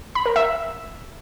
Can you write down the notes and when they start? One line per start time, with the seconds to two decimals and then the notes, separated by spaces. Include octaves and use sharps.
0.15 B5
0.26 A#4
0.36 E5